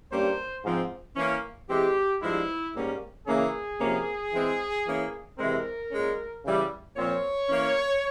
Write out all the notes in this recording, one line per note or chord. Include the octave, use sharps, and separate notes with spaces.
G2 G3 A#3 C#4 C5
G#2 F3 C4
E3 A#3 C#4
E3 G#3 C4 G4
G2 F3 G#3 E4
G#2 G3 A#3 C#4
C#3 E3 A#3 C#4 G#4
C3 F3 A#3 C#4
E3 G#3 C4
E3 A#3 C#4
C3 E3 G#3 C4 A#4
A#2 G#3 C#4
C#3 E3 G3
A#2 F3 C4 C#5
E3 A#3 C#4